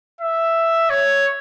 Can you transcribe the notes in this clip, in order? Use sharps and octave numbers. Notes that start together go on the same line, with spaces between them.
E5
C#5